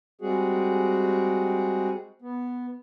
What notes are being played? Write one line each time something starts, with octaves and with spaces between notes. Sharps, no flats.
G3 G#3 C4 F#4 G#4
B3